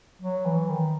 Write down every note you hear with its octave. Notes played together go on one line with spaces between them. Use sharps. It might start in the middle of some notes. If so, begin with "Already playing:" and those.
F#3
E3
D#3